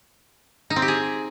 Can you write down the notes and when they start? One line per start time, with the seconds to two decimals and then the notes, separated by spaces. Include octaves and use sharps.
0.70 D#4
0.76 C4
0.82 G4
0.88 G#4